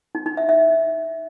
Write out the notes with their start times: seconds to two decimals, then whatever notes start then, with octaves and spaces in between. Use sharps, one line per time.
0.15 D#4
0.26 D#4
0.37 E5
0.49 E5